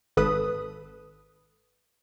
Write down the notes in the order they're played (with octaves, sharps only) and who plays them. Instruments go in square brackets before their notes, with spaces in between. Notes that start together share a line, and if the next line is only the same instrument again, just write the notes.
[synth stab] G#1 A4 B4 D#6